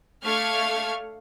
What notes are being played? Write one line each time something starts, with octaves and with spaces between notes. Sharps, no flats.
A3 D4 F5 C#6 F6 G#6